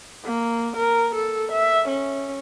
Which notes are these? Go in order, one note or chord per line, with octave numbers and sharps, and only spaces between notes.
A#3
A#4
A4
E5
C#4